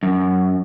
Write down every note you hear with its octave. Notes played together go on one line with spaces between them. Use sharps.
F#2